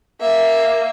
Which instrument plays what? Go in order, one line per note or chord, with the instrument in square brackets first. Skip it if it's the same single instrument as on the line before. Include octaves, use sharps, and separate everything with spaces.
[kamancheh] A#3 [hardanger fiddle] E5